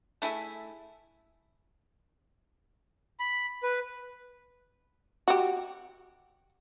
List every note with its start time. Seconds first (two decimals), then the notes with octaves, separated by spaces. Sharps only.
0.22 A3 E4 G#4 E5
3.20 B5
3.63 B4
5.28 F#4 G4